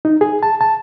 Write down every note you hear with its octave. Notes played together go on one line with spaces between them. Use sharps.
D#4
G#4
A5
A5